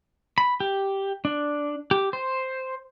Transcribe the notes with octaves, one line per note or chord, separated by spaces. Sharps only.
B5
G4
D4
G4
C5